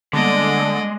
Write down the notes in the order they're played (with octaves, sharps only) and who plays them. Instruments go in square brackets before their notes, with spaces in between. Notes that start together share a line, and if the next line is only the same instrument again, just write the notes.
[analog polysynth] D3 [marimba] G3 A#3 B3 [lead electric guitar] G#3 [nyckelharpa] D5 D#5